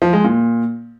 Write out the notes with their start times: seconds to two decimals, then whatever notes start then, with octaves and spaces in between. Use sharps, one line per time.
0.02 F3
0.13 G#3
0.24 A#2